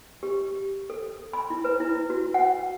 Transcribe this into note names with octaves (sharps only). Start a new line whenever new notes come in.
G4
A4
B5
E4
B4
E4
F#4
F#5